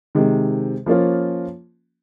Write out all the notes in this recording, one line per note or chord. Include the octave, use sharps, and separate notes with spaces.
C3 D#3 G#3
F3 A#3 C#4 F4